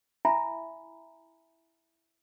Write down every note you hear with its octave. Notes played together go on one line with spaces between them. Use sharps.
E4 E5 G#5 A#5 B5